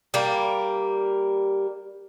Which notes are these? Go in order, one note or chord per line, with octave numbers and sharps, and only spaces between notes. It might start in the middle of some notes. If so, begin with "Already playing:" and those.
G3 A#3